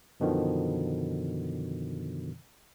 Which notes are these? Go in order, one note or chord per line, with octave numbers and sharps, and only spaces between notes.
F#2 B2 D3 D#3 F3